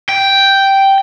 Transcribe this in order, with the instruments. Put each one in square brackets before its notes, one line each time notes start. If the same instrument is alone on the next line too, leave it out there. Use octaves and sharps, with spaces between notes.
[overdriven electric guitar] G5